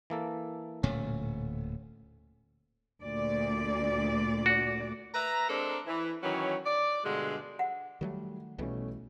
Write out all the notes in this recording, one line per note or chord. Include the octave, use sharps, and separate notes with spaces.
E3 A#3 A4
D1 A#2 A3 C#4
D2 A#2 D5
F#4
B4 E5 A#5
G#3 C4 D4 A4 A#4
E3
D#3 E3 F#3 C#4
D5
G2 B2 D3 G#3
F#5
D#3 F#3 G3 A3
B1 B2 E3 G3 A3 C#4